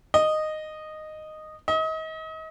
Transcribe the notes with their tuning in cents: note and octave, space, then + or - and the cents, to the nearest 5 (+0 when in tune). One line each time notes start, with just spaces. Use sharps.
D#5 -10
D#5 +35